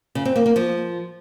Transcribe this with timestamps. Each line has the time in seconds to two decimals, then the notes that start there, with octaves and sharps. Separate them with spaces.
0.15 C#3
0.25 C4
0.36 A#3
0.46 A#3
0.56 F3